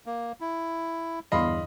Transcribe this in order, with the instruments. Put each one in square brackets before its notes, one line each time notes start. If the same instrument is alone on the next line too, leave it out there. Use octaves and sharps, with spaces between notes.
[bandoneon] A#3
E4
[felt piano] G1 E2 C6 [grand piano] D#5 F5 B5